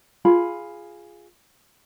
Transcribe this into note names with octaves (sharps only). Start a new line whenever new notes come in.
F4 G#4 B5